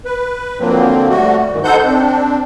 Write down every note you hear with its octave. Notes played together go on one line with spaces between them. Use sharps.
B4
D3 F3 F#3 A#3 C4
G3 A3 F#4
G2 D#3 E3
D#4 A4 C5 F#5 G6
C4 D4